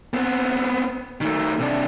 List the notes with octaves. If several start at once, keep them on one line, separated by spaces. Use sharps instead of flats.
B3 C4
D#3 A3
C3 D4